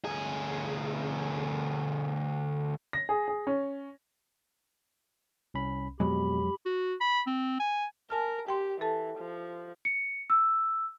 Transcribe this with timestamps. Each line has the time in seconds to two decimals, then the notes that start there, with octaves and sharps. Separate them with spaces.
0.05 D2 G#4
2.93 A#6
3.09 G#4
3.28 G#4
3.47 C#4
5.54 C2 C#4 B5
6.00 F2 B2 F#3 G#3 G4 B5
6.66 F#4
7.00 B5
7.27 C4
7.60 G#5
8.10 A#4 G#5 A5 F6
8.48 G4 G5 C6
8.81 E3 A4 A5
9.18 F3
9.85 C#7
10.30 E6